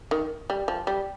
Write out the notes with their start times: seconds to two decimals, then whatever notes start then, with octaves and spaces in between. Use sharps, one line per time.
0.11 D#3
0.50 G3
0.68 F3
0.87 G3